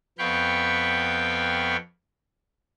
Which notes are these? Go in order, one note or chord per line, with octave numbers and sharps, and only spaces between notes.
F2 B3 F5 G5 B5 C#6